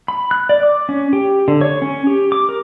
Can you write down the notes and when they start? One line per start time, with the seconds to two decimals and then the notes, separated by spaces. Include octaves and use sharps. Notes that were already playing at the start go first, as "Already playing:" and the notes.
0.08 B5
0.31 F#6
0.49 D5
0.63 D6
0.89 C#4
1.13 G4
1.48 D3
1.61 C#5
1.82 C#4
2.07 G4
2.32 D6
2.49 A#4